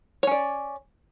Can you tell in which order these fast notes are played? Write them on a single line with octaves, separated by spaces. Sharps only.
C#5 C#4 D5